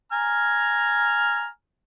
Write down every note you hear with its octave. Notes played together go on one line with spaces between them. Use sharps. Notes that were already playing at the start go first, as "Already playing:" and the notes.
G#5 A#5 F6